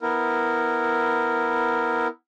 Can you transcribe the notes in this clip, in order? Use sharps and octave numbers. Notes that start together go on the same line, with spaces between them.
B3 E4 A#4